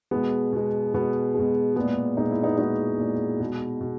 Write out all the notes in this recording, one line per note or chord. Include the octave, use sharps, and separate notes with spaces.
B2 G#3 B3
B2 G#3
B2 G#3 B3
B2 G#3
A#2 G#3 B3
A#2 G#3 D#4
E4
B3 D#4
A#2 G#3 D#4 F#4
A#2 G#3
B2 G#3
B2